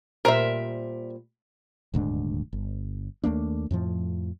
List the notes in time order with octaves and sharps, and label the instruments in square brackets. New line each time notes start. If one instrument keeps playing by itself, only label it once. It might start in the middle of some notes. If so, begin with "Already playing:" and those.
[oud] A#2 G3 C5 [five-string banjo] A#4 E5
[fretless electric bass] D#1 D2 G#2 D4
G1
D#2 A3 A#3 D4
F2 A2 F3